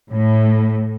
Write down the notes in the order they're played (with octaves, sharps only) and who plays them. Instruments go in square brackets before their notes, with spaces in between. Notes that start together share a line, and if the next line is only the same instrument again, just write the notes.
[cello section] A2